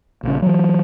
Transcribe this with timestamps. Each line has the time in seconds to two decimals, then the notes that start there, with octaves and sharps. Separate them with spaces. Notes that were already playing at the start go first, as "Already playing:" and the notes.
0.23 A#1 C#3
0.42 E3 F#3